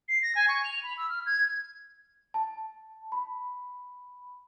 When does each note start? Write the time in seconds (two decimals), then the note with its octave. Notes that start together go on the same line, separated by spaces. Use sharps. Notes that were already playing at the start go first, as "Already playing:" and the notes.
0.08 C7
0.22 A#6
0.35 G#5
0.48 C#6
0.64 F7
0.83 B5
0.97 E6
1.09 F6
1.26 G#6
2.34 A5
3.12 B5